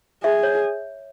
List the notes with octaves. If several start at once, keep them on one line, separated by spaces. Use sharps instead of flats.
G#4 E5
C#5